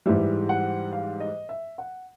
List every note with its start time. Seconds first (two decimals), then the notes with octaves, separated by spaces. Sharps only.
0.06 G#2 E3 G3 E5
0.49 F#5
0.93 F5
1.20 D#5
1.49 E5
1.78 F#5